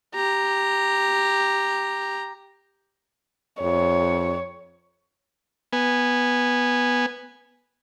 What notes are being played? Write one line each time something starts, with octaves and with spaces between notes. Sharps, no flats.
G4 A#5
F2 C#5
B3 G#5